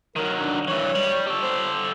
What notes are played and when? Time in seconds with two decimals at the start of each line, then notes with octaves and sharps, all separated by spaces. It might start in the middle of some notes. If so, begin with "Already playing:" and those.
0.16 D#3 F#3 A#4
0.41 D4
0.68 G2 E3 C#5
0.95 G3
1.27 G4 A4
1.42 C5